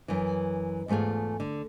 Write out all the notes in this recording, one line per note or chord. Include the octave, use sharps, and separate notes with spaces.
F#2 E3
E2 G#2 A3 F4 G#4
D3